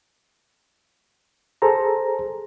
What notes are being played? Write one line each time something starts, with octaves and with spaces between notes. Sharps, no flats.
G#4 A4 C5 A#5